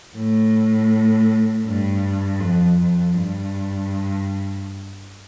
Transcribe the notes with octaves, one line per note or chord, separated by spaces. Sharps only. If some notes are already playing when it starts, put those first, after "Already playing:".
A2
G2
F2
F2
G2